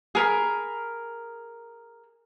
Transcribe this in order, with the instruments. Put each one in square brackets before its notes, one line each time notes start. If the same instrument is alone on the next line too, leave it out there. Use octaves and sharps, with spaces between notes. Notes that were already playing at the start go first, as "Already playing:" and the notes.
[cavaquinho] G#4 A#4 B5